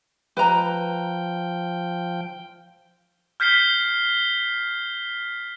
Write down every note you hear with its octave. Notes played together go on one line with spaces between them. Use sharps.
F3 B4 G5 A#5
F6 G6 B6 C7 G7